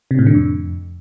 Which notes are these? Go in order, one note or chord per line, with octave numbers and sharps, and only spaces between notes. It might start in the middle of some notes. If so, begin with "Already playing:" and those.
C3
A2
D3
F2